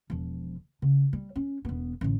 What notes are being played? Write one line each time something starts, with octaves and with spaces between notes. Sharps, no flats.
E1 F3
C#3
G3
C#4
E1 B3
A1 D3